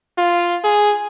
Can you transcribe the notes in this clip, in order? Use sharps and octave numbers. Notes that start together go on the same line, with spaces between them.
F4
G#4